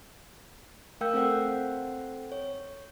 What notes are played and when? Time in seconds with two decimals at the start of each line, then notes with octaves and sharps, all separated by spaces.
1.01 A3 A#4 F5 G5 E6 G6
1.14 C4 A4 C5 F#5 G5
2.32 C#5